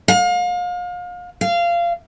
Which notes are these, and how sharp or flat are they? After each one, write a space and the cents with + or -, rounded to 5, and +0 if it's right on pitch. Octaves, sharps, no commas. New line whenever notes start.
F5 +35
F5 -20